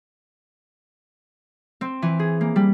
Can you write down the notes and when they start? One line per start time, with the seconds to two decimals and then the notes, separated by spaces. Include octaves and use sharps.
1.81 C4
2.02 E3
2.19 G#4
2.41 A#3
2.56 G3